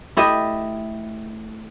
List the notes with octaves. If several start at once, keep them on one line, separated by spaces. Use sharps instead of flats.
A3 E4 G4 D#5